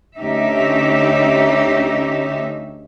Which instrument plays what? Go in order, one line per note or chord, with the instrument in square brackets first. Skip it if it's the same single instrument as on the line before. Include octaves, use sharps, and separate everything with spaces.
[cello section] D2 C#4 D#4 G4 E5